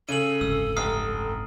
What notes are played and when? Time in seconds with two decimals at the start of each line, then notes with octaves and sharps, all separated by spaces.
0.09 C#3 A4 D#7 F#7
0.41 F#1 C2 G#2 E6
0.77 F1 D#6 F6 C7